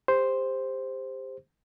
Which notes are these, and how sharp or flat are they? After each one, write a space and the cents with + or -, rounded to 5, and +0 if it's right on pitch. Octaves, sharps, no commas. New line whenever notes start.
G4 +30 C5 +0